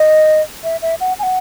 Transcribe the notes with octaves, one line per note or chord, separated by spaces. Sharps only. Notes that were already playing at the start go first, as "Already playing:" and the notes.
Already playing: D#5
E5
E5
F#5
G#5
F#5